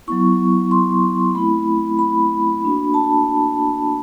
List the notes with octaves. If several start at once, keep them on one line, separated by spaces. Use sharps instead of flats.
F#3 B3 E4 C#6
C6
A3 C4 E4 B5
B5
A#3 D4 F#4
A5